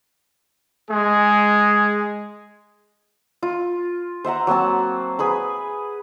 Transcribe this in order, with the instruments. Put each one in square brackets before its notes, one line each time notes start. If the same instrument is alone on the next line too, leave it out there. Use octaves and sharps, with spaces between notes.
[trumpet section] G#3 G#4
[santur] F4
C5 E5 F#5 A#5
F#3 A#3 C4 A5
G#4 B4 B5